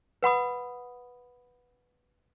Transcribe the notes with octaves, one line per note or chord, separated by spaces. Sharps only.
B4 F#5 B5 D#6